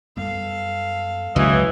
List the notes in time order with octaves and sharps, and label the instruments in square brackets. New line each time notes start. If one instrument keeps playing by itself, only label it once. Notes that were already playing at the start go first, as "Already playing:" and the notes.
[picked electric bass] F#2 G3 B3 [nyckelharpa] A4 F5
[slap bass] C#2 F#3 [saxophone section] E3 D#5 [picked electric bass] B3